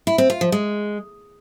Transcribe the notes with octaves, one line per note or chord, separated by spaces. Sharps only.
E4
C4
F4
F3
G#3